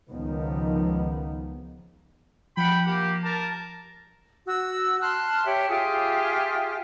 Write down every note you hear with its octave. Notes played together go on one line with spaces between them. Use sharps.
C#2 D#3 F3 B3
F3 F#5 G5 B5
A#3 G4
A#4 A5
F#4 E6
A5 C6 F6 F#6
G4 C#5 E5
F4 G4 G#4 E5